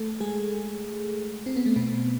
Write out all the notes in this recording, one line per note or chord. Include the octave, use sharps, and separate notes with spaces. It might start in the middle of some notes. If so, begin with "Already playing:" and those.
Already playing: A3 A4
G#3 G#4
C4
B3
A3
B2 B3